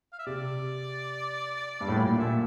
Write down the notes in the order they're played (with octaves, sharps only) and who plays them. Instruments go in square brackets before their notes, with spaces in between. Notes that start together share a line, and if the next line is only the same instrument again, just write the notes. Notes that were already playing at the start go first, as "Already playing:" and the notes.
[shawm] F5
E5
[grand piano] C3 [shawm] D5
[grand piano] G2
A2
[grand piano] A#2 [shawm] D5
[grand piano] A#2 [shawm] E5